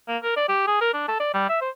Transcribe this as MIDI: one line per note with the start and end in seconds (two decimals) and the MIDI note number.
0.08 0.17 58
0.23 0.33 70
0.36 0.47 74
0.48 0.66 67
0.67 0.79 68
0.81 0.93 70
0.94 1.05 62
1.08 1.18 69
1.20 1.30 74
1.34 1.49 55
1.49 1.59 76
1.61 1.70 72